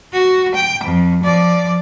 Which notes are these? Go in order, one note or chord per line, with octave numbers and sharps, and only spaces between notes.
F#4
G5
F2
F3 D5